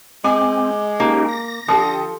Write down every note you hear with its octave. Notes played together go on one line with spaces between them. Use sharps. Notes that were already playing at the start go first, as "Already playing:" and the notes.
G#3 C4 G#5 D6
A#3 C#4 D#4 G4
A#6
D3 F3 G4 A4 D#6